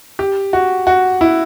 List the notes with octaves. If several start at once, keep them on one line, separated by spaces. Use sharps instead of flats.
G4
F#4
F#4
E4